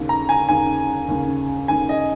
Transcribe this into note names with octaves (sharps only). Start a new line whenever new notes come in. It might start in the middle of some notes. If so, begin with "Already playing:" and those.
Already playing: D#2 C#3
A#5
G#5
D#2 C#3 G#5
D#2 C#3
D#2 C#3 G#5
D#5